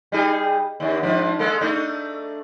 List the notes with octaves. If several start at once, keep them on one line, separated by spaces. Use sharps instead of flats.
G3 D#4 G#4
D#2 D4
G#2 F3 D4
G#3 A#3 A4
A3 D4 D#4